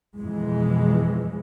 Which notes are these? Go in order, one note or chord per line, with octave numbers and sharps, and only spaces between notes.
F2 B2 E3 G#3